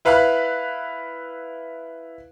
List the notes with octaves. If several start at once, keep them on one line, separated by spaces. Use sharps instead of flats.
E4 B4 F5 B5 F#6